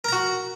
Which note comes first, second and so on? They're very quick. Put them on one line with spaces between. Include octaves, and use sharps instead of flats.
A#4 A#5 F#4